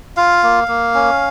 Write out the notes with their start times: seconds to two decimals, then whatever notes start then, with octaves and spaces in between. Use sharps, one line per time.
0.17 F4 F5
0.43 A#3
0.68 A#3
0.94 C#4